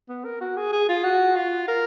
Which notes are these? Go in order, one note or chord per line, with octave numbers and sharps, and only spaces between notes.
B3
A#4
F#4
G#4
G#4
F4
F#4
F4
A#4